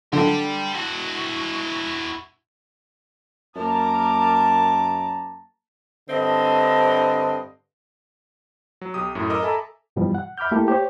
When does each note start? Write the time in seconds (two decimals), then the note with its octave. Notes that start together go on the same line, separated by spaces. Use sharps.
0.13 D3 D5 G5
0.74 E4 F#4
3.56 F#2 A#3 A#4 A5 A#5 D6
6.09 G2 D3 C4 D#5
8.81 F#3
8.94 B1 G4 D#6
9.15 F#2 A2
9.30 A#4 D#5 A#5 D6 E6
9.43 A4 E5 G#5 A#5 B5
9.96 G2 B2 E3 F3 G3
10.15 F#5
10.38 E5 B5 D6 F6 G6
10.52 A3 A#3 E4 G4 A4
10.68 G4 C5 C#5